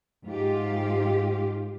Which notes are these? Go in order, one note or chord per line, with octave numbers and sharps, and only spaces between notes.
G#2 F4 G4